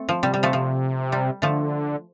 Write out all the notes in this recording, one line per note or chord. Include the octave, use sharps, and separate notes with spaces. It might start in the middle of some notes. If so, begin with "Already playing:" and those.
Already playing: A3 C4
F3
C3 G3
G3
F3 A3
F3
G3
D3 F3 A3